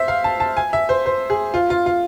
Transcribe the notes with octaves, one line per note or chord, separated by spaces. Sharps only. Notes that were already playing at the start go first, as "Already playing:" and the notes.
Already playing: C5 E5
F5
A5
A5
G#5
E5
C5
C5
G#4
F4
F4
F4